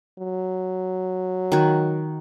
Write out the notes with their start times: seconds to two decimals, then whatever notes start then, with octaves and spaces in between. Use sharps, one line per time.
0.19 F#3
1.52 D#3 F#4